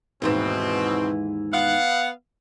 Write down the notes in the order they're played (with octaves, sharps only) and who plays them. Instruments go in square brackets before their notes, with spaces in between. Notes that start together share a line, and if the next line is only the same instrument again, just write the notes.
[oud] D#2 G#2 E3 [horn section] B2 C4
[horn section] B3 F5 F#5